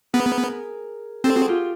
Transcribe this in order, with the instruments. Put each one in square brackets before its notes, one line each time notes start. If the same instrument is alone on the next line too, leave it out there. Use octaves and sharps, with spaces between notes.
[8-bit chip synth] B3 [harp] G#4 A#4
[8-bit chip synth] C4 [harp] G4 A4
[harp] F#4 G#4
F4 G4